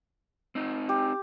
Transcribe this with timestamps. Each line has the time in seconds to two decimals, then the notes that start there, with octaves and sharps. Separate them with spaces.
0.55 C4 D#4
0.89 G4